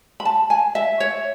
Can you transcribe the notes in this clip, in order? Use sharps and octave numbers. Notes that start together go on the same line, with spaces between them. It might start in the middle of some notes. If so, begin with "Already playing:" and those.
B5
A5
G#5
E5
C#5